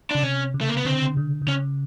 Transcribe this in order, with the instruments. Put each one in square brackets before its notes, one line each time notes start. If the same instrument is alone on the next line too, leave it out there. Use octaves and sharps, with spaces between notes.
[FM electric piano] C#3 [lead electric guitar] D4
[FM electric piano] C3 [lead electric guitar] C#4
[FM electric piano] C#3
[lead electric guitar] A3
A#3
B3
[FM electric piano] D3 [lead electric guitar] C4
[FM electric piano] D3
D3
[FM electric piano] C#3 [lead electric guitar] C#4